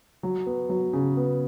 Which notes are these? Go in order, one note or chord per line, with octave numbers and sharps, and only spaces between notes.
F#3
B3
F#3
C#3
B3